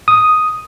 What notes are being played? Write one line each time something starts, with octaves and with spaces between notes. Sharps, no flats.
D#6